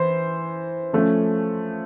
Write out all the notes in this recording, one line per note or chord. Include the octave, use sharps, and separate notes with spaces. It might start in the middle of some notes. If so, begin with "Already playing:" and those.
Already playing: E3 C5
F3 A3 C#4